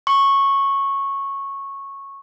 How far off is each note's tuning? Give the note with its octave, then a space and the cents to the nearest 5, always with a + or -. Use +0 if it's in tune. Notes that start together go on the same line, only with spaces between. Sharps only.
C#6 -10